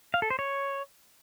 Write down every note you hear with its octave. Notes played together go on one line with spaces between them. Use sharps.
F5
A4
C5
C#5